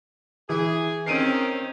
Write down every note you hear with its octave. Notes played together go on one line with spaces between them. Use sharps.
E3 E4 G#4
D#3 C4 C#4 C7 D7 D#7